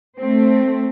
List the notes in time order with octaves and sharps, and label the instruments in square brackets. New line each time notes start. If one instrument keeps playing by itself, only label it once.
[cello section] A3 C4